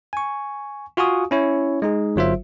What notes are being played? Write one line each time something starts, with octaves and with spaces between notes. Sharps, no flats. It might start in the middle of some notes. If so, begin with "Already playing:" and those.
G#5 C#6
F4 F#4 F5 G#5 C#6 D#6
C#4 E4 C#5
G#3 D#4 G#4
G1 F#3 F4 C5 E5